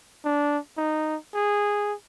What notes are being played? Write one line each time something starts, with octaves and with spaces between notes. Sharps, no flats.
D4
D#4
G#4